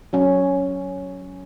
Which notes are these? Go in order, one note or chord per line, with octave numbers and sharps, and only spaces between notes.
F#3 C#4